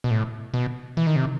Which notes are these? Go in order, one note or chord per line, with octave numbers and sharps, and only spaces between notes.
B2
A2
B2
E3
D#3
C3